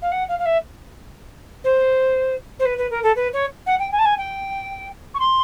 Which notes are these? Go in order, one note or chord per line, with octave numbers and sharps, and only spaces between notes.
F5
F#5
F5
F5
E5
C5
C5
B4
B4
A#4
A4
B4
C#5
F#5
G5
G#5
A5
G#5
G5
C#6
C6